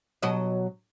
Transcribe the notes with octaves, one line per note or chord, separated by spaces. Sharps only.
B2 F#3 D#5